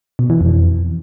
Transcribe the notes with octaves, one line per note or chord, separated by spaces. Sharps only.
B2
E3
F2